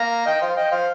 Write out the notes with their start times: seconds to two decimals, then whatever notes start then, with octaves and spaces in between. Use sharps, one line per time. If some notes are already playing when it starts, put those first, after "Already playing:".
Already playing: F5 A#5
0.26 D#5 G5
0.41 C5 F5
0.57 D#5 G5
0.71 C5 F5